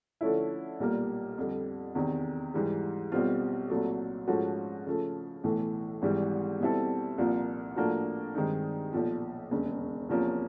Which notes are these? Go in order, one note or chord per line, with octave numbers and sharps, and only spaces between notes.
D3 F3 A3 C#4 E4
B1 A#2 G3 A#3
F2 D3 G3
E2 C3 D#3
G#2 E3 G3
B1 B2 G3 C4 F4
C2 A#2 F#3 A3
G#2 F3 A3 C#4 F#4
C#3 F3 A3
B1 A2 E3 A3
G#1 G#2 E3 G3
B2 G3 C4 E4 A4
C2 A#2 F3 A#3
A2 F3 A#3 D4 F#4
G2 D#3 G#3 C4 D#4
B1 A#2 F3
E1 D#2 C#3
E2 C3 F3 A#3 C#4